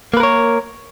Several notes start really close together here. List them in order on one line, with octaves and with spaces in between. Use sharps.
A#3 B4 A#4 C#5